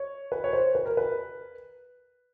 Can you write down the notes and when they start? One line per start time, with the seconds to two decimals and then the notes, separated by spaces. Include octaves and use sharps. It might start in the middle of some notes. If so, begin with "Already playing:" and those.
Already playing: C#5
0.32 B4
0.44 C#5
0.53 C5
0.75 B4
0.86 A#4
0.97 B4